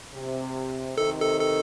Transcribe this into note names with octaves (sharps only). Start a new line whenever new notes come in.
C3
C3 D#3 A4
A4
A4